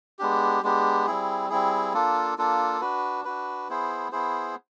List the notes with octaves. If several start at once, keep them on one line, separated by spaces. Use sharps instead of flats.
G#3 B3 D4 G4
G#3 B3 D4 G4
G3 C4 E4 G#4
G3 C4 E4 G#4
A#3 D4 F4 A4
A#3 D4 F4 A4
D4 F#4 B4
D4 F#4 B4
B3 E4 G#4 C5
B3 E4 G#4 C5